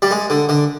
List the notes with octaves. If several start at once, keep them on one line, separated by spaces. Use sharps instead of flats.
G3
G#3
D3
D3